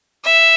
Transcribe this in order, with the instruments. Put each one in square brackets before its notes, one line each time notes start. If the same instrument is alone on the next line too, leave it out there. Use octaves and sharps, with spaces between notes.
[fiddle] E5